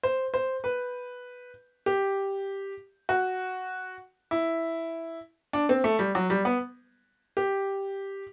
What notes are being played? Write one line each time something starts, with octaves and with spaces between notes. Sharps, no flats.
C5
C5
B4
G4
F#4
E4
D4
C4
A3
G3
F#3
G3
B3
G4